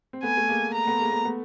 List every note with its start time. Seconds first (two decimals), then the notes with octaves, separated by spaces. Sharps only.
0.13 C4
0.23 A3 B3 G#5
0.37 A3
0.49 G#3 A#3
0.74 A#5
0.87 A3 B3
1.00 G#3 A#3
1.12 A3 B3
1.25 A3 B3